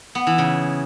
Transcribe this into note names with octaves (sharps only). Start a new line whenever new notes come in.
B3
E3
C#3